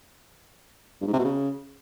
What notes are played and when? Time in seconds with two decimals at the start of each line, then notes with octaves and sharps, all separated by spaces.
1.01 G2
1.07 G#2
1.13 C3
1.19 B2
1.25 C#3